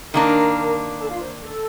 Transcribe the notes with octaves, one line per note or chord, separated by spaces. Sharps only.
D#3 A#3 D4 A#4 A#5
A4 A5
F4 F5
C5
A4